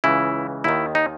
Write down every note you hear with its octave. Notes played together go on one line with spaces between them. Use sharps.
C#2 C#3 E3 E4
D#2 D#3 E4
D#4